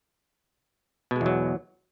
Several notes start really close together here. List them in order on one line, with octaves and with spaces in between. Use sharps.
B2 G#3 E2 F#3